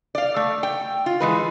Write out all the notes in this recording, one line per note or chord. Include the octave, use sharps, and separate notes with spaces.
D5 F5
A3
G5
F4
E3 G#3 B4